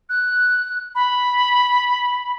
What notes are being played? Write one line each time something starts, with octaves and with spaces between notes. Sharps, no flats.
F#6
B5